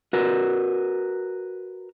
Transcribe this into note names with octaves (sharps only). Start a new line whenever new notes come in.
F#4 A#4 B4